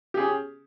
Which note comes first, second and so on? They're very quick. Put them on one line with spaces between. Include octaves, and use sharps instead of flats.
G4 G#4 C#4